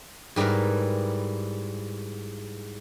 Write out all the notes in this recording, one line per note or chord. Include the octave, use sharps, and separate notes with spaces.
G#2 G3 E4 A#4 B4